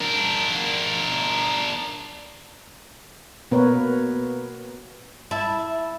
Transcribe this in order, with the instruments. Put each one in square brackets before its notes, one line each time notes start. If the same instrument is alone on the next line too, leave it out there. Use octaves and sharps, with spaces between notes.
[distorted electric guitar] D4 A#4
[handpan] B2 A#3 B3 A#4 B4 C#5
[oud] E4 [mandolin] E5 A5